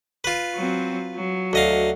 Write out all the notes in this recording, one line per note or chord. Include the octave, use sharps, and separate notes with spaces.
F4 B4
F#3 C4
F#3
D2 D#5 F5